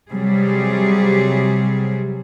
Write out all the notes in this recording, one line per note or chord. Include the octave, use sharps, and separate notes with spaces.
C3 F#3 G3 G#4